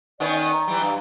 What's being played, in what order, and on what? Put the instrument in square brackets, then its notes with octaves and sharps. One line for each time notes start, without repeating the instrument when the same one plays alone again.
[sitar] D#3 B3 C#4 [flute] D5
[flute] A#5
[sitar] E3 G3
G2